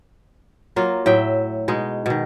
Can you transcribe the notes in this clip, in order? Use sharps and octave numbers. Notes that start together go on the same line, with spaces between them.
F#3 A#3 F4
A2 F#3 E5 G5
B2 G#3 D#4
B2 D#3